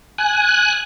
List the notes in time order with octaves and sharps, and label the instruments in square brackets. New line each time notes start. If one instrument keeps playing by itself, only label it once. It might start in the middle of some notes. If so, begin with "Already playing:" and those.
[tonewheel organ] G#5 F#6